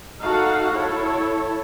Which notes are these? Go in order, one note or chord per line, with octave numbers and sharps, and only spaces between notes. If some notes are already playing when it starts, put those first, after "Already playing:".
D#4 F#4 A4 F5 F#5
E4 A4 C#5